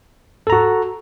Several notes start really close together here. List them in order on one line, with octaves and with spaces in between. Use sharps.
A4 A#5 F#4